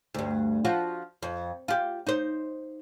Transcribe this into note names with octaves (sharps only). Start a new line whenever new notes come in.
D2 G2
F3 F4 F#4
F2
F4 G4
D#4 C5